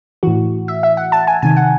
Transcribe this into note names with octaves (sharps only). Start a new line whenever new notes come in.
A2 E3 F#4
E5
E5
F#5
A5
G#5
C3 D#3 G#5
F#5